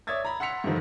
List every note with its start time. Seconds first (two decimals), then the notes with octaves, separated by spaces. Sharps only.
0.07 C#5 D5 E5 D#6 G#6 A6
0.25 A#5 B5
0.40 F#5 C6 E6 B6 C#7 F7
0.64 G2 D3 D#3 F3